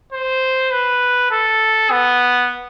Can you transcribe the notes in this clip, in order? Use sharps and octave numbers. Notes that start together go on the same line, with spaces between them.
C5
B4
A4
B3